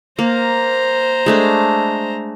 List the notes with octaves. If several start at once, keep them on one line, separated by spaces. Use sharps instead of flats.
A#3 C5 A#5
G#3 A3 D4